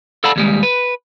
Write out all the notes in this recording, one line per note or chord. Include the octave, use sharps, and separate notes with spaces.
A4 D5 F5 F#5 A5 B5
D#2 G3 G#3
B4